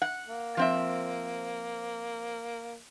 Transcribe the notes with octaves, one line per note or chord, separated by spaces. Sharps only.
F#5
A#3
F3 C4 E5